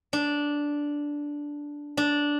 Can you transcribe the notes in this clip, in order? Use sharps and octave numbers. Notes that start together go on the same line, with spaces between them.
D4
D4